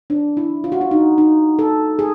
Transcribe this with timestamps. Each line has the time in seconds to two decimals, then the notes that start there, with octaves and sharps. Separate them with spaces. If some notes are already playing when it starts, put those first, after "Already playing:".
0.10 D4
0.37 E4
0.64 F4
0.72 F#4
0.81 F4
0.91 D#4
1.18 D#4
1.59 A4
1.99 G#4